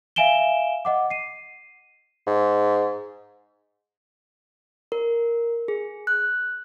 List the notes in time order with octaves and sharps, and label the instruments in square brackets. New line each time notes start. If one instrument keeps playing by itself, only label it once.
[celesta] E5 F5 G#5 D7 E7 G7
D#5 F#5 D6
C7 D#7
[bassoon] G#2
[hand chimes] A#4
G#4
F#6